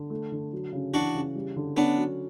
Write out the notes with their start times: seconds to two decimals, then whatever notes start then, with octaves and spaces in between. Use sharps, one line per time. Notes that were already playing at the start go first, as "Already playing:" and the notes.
Already playing: D3
0.10 A3
0.32 D3
0.53 F#3
0.73 C#3
0.93 E3 D4 F#4
1.15 C#3
1.35 G3
1.56 D3
1.76 B3 C#4 D4
1.97 F#3